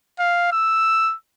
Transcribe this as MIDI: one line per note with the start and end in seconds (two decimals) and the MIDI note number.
0.19 0.48 77
0.52 1.15 88